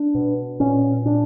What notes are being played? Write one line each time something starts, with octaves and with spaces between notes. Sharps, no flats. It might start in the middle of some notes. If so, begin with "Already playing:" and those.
Already playing: D4
B2
A#2 C#4
A#2 D4